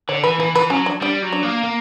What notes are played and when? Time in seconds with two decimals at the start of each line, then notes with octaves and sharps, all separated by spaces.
0.09 D3 C#5
0.24 E3 B4
0.39 E3 B4
0.55 E3 B4
0.70 F#3 C#4
0.86 D4
1.01 G3 D4
1.22 F#3
1.32 D4
1.43 A#3
1.64 A#3